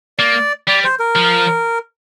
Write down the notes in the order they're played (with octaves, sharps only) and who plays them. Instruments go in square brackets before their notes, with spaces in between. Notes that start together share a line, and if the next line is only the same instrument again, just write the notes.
[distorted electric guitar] A#3 [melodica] D5
[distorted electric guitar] G3 [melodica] D5
[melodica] C5
A#4
[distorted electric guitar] F3